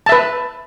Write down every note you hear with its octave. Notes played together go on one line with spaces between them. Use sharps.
B4 E5 A5